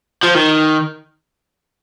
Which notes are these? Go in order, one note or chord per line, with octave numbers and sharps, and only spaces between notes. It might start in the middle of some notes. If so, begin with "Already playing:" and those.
F3
D#3